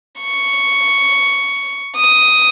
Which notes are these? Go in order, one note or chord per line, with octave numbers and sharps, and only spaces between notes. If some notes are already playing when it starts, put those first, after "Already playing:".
C#6
D#6